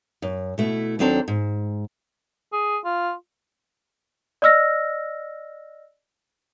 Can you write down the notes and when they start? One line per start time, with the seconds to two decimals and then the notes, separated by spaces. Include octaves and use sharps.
0.22 F#2
0.58 B2 A3 E4
0.99 D#2 F#3 C4 D4 A4 A#5
1.28 G#2
2.52 G#4
2.84 F4
4.42 D5 D#5 E6 F6 A#6